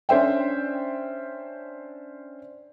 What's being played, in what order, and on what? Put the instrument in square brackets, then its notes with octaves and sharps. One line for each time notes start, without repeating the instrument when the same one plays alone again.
[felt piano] C#4 D4 C5 E5 G5